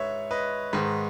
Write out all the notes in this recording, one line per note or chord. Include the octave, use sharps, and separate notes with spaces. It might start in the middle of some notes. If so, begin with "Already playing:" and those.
Already playing: G#2 B4 C#5 E5
B4 D#5
G#2 D#3